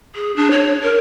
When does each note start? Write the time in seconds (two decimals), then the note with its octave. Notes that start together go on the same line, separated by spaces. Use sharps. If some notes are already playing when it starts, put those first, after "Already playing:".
0.16 G#4
0.36 D4
0.51 C#5
0.84 A#4